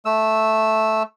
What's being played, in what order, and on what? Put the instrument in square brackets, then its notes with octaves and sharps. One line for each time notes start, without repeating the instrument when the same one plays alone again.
[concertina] A3 E6